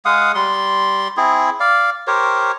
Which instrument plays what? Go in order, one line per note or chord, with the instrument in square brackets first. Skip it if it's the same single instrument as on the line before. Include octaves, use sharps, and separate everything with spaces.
[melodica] G#3 F5 F#5 D#6
G3 C6
C4 E4 G#4
D5 F5
G4 A#4 C5 C#5